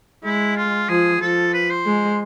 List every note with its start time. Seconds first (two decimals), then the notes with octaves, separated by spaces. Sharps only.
0.24 G#3 E4
0.56 F4
0.88 F3 G#4
1.21 F3 A4
1.53 B4
1.70 C5
1.86 G#3